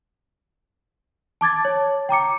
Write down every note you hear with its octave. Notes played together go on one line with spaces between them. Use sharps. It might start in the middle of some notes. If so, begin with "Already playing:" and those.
A5 D6 G#6 A6
C#5
G5 A#5 D6 C#7